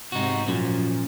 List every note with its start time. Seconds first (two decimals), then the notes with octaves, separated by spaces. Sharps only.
0.12 G#2 C3 D#4 F#4
0.48 F#2 A#2 F3